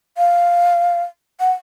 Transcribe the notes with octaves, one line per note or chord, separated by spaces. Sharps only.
F5
F#5